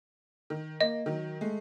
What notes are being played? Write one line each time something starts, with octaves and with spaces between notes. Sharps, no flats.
D#3
A#3 D#5
D#3 F#3
G#3 A3